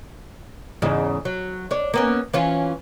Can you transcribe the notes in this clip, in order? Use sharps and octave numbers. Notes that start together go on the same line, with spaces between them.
E2 G#2 C#3
F#3
D4 C#5
A#3 B3 C#4
E3 C#4 F4